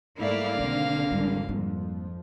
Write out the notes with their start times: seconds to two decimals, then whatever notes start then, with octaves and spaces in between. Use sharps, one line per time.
0.18 G#2 G3 A3 A#3 E4 D5 F5
0.59 B1 D3 D#3 C4
1.11 G#1 E2 G3 C4
1.49 F2 F3 G3 A#3